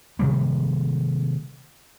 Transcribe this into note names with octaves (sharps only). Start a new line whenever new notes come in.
C3 D#3 G3 A#3